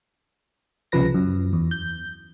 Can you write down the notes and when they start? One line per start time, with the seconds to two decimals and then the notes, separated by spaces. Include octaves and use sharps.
0.92 C2 C#3 F3 B4 A#6
1.14 F#2
1.53 E2
1.71 G6